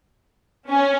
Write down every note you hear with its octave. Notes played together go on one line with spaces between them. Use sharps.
C#4